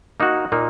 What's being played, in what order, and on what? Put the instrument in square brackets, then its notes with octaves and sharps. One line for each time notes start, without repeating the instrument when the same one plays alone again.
[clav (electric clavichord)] A#3 D#4 F#4
A#2 A#3 D#4